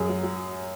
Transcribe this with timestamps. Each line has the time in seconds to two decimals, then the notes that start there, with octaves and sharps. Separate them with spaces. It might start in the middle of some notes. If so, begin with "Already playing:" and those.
Already playing: F#2 G#4
0.09 F#3
0.23 F#3